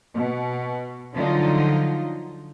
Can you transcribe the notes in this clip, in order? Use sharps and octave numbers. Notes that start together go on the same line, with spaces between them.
B2
D3 F3 F#3 D#4 F4